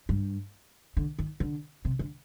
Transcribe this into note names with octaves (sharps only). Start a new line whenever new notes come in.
G2
D3
D#3
D3
C3
D3